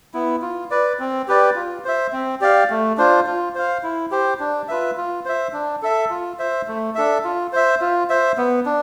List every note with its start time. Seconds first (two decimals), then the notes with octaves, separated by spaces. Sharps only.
0.14 B3 E4
0.42 F4
0.70 B4 D5
1.00 C4
1.28 G4 B4 D5
1.56 F4
1.85 C5 E5
2.12 C4
2.41 G4 D5 F5
2.70 A3
2.97 D4 F4 C5
3.26 F4
3.55 C5 F5
3.83 E4
4.11 G4 C5
4.40 D4
4.68 F4 B4 E5
4.97 F4
5.25 C5 E5
5.53 D4
5.82 A4 E5
6.10 F4
6.39 C5 E5
6.68 A3
6.95 D4 A4 E5
7.24 F4
7.53 C5 E5
7.81 F4
8.10 C5 E5
8.38 B3
8.66 D4